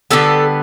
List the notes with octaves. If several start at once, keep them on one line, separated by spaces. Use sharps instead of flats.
D3 G3 B3 A4